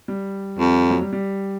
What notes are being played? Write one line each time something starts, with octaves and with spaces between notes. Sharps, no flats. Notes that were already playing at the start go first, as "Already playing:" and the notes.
G3
F2
F#3
G3
G3